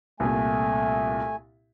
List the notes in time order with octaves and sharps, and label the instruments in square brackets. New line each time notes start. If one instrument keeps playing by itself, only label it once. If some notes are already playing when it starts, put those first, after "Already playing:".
[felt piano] C2 A#2 [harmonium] A3 G#5